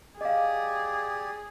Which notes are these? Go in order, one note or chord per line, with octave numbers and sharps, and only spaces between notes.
G4 G#4 D5 D#5 F5